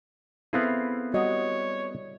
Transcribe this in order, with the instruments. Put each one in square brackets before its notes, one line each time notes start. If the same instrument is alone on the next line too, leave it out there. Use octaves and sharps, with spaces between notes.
[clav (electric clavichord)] B3 C4 G#4 [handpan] E4 A4 F5
[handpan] G3 [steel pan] F#4 D#5 [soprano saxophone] C#5